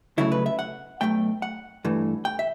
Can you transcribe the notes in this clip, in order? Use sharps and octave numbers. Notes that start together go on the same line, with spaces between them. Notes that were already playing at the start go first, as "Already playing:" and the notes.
C#2 C#3 F#3 A3 E4
B4
E5
F#5
B1 B2 A3 G5
F#5
G2 E3 A3
G5
E5